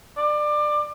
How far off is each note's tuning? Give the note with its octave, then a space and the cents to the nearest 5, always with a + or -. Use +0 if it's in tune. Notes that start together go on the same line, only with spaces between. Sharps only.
D5 +25